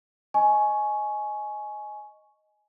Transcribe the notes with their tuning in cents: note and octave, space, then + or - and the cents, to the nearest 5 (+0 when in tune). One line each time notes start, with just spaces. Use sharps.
D#5 +0 G#5 +20 C#6 +0